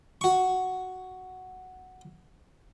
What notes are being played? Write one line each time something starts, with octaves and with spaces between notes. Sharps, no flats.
F#4 C#6